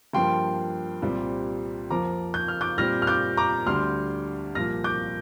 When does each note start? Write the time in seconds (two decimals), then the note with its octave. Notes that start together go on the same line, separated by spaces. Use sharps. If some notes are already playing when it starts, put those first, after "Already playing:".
0.13 G2 F3 A#3 G5 C6
1.02 C2 A#2 G3 C4
1.90 F2 F3 A#3 A#5 D6
2.34 G6
2.48 F6
2.61 D6 G6
2.78 A#2 G3 C4 F6 A#6
3.02 F6
3.07 D6 G6
3.37 A#5 D6
3.66 D2 D3 G3 C6 F6
4.55 C2 A#2 F3 A#3 F6 A#6
4.84 D6 G6